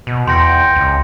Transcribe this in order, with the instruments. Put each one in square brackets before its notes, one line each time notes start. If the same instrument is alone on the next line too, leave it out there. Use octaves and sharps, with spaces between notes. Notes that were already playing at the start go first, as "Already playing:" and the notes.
[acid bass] B2
[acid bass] E2 [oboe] G5 [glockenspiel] C6 A#6 C#7
[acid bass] C#2